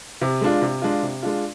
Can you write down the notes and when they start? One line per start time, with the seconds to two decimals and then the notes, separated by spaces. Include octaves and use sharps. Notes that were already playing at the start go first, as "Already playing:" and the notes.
0.22 C3
0.41 G#3 D4 F4
0.62 C3
0.82 G#3 D4 F4
1.03 C3
1.23 G#3 D4 F4